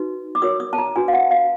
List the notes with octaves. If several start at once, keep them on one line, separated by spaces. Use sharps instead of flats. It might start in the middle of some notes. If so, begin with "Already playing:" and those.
Already playing: D#4 F#4 B4
D6
F#4 A#4 C#5 D#6
D#6
A5
A#5
D4 F#4 B4 G#5
F5
F#5
F5